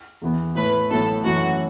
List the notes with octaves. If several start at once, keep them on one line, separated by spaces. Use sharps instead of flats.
E2 E3 B3
A2 A3 E4 B4
A1 A2 F#3 B3 E4 A4
F#2 E3 A3 F#4